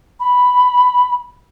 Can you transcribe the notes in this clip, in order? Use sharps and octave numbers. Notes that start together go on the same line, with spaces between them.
B5